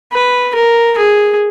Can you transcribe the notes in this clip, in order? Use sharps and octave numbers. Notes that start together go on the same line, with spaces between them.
B4
A#4
G#4